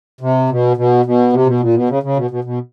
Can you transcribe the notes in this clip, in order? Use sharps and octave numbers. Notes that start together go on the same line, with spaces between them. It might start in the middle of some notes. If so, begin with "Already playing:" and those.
C3
B2
B2
B2
C3
B2
A#2
B2
C#3
C#3
B2
B2
B2